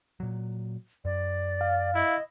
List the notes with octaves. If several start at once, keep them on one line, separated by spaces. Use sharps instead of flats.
A#2 F#3
F#2 D5
F5
E4 D#5